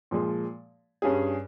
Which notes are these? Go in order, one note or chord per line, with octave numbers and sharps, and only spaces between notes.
A#2 F3 G#3
G2 G3 C#4 G#4